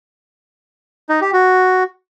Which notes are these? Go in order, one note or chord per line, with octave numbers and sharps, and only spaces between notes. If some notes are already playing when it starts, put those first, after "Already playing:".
D#4
G4
F#4